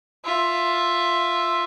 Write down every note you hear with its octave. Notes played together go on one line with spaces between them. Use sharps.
F4 E5